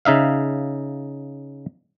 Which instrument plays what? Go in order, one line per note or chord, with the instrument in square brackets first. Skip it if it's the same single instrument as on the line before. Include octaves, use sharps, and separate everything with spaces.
[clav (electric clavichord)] C#3 D#4 E5 F5